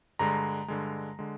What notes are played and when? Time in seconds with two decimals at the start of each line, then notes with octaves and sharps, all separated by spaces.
0.19 G2 D3 G#3 A#5
0.68 G2 D3 G#3
1.19 D3 G#3